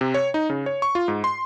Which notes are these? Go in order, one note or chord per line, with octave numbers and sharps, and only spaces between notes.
C3
C#5
D#4
C#3
C#5
C#6
F4
G#2
C6